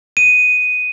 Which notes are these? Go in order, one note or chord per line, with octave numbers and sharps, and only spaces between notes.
D#7